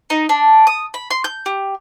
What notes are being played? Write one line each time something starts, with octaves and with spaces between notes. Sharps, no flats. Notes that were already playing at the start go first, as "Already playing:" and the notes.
D#4
D4
D#6
B5
C6
G6
G4